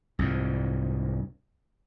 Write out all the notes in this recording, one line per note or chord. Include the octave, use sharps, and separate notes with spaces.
C2 F2 G#2